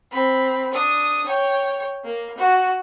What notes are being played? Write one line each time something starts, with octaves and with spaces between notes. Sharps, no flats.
C4 B5
D4 D#6
C#5 G5
A#3
F#4